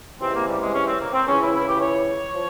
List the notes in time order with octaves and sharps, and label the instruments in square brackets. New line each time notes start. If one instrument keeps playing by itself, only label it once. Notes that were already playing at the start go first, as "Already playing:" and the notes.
[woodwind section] C#2 C3 E3 C4
A#3
G3
G#3
C#4
C4
A#3
C4
C#2 C#3 E3 C#4
E4
E4
G4
C#5
F3